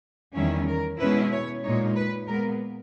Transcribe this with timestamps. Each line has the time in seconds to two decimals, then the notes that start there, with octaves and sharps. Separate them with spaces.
0.35 E2 D#3 G3 C#4 E4
0.68 A#4
0.99 B2 G#3 C#4 E4 B4
1.32 C#5
1.63 A#2 G#3 D#4 C#5
1.96 B4
2.27 A#2 G#3 B3 A#4